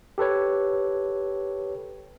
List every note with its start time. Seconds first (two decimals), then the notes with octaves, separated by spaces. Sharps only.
0.18 G4 A4 B4 C#5